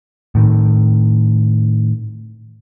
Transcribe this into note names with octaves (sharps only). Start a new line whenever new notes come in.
A2 D#3